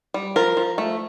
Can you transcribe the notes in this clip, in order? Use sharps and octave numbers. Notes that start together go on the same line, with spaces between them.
G3
F3 A#4
F3
A3